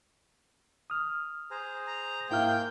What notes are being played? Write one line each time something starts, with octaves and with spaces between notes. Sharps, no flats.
D#6 F6
G#4 C5 A#5
A#5
G#2 A#3 E4 G5 F6 G6